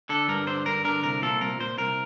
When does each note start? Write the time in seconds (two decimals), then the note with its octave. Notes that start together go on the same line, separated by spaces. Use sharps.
0.09 D3 A4
0.28 G2 A#4
0.47 D3 C5
0.66 G2 A#4
0.85 D3 A#4
1.03 C2 A#4
1.22 A#2 A4
1.41 C2 A#4
1.60 A#2 C5
1.78 C2 A#4